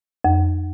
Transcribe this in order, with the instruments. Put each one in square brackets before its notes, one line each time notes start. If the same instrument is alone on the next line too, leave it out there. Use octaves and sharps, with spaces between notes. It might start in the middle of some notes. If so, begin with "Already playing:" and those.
[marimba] F2